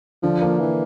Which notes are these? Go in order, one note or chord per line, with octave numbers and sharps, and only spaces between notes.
D3 F3
A#3
E3